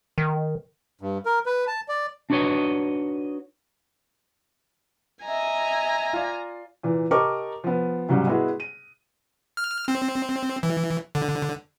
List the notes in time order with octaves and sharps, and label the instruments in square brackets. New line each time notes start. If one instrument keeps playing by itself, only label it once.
[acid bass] D#3
[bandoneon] G2
A#4
B4
A5
D5
[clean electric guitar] D4 D#4 F#4 B4 C#5 D#5
[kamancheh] D#5 E5 [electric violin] G#5 A#5
[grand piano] F4 D5
[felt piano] A#2 E3
G4 A#4 D#5 A5 C#6 D6
F3 B3
G#2 C#3 F#3 G3
G#3 B3 E4 F#4 G#4
D#7
[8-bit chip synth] F6
C4
E3
D3